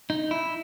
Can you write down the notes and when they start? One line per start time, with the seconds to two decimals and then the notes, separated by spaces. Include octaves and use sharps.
0.10 D#4
0.31 E4